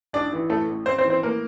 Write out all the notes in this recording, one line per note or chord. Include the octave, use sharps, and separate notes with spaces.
A1 D4 D5
E3
A2 A3 A4
A1
A1 C4 C5
C4 C5
E3
C4 C5
A2 A#3 A#4